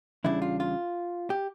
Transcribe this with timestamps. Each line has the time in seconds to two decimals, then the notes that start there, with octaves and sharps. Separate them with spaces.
0.24 E2 C#3 G3 D4 E4
0.42 F4
0.60 F4
1.30 G4